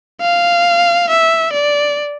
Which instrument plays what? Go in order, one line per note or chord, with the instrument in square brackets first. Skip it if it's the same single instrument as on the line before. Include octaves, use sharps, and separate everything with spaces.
[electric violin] F5
E5
D5